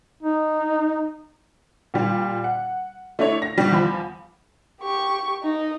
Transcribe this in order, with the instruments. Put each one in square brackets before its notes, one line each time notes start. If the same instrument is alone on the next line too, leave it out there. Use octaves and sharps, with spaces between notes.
[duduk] D#4
[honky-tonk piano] A#2 G3
F#5
A3 D4 E4 C#5
A#6
B2 G3
E2 F3 B5
[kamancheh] G4 C#6
D#4 D#5